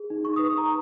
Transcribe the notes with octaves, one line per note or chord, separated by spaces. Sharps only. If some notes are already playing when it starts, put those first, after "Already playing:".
Already playing: G#4
D#4
C#6
B4 D#6
C#6
A#5